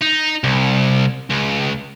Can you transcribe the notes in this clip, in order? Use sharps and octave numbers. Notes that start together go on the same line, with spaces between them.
D#4
C2
C#2